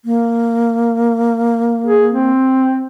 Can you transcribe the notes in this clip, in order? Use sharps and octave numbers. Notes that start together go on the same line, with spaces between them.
A#3
G#4
C4